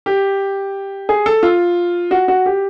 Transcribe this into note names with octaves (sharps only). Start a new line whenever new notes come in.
G4
G#4
A4
F4
F#4
F#4
G4